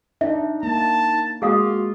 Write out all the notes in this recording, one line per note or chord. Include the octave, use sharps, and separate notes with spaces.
D4 D#4 E5
A#3 A5
G#3 A#3 F4 F#4 G#4 F5 D#6